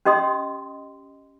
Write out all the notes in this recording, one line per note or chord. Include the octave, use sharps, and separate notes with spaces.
C#4 G4 D#5 C6 D#6